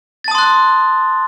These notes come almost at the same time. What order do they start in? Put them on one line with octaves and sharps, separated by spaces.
A6 A5 D#6 C6 F#6